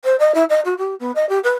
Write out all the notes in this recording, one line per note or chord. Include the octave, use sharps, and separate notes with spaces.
C5
D#5
E4
D#5
F#4
G4
B3
D#5
G4
B4